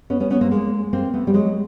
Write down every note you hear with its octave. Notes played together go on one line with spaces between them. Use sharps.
B3 C#4
B3 C#4
B3 C#4
A#3 C4
G#3 A#3
A#3 C4
A3 B3
G3
F#3 G#3